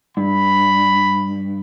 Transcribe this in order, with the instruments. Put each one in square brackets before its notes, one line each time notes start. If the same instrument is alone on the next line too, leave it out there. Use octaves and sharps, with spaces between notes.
[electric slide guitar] G2 [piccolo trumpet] B5